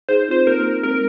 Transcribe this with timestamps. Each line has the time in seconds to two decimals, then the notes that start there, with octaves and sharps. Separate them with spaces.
0.09 D#4 G#4 C5
0.28 C4 F4 C5
0.46 A#3 D#4 A#4
0.83 G#3 C4 A#4